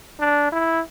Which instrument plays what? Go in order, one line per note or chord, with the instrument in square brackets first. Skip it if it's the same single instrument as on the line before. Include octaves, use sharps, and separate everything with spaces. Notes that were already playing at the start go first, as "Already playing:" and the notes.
[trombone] D4
E4